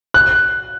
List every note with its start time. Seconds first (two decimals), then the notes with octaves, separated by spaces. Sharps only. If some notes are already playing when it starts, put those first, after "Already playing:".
0.14 F#6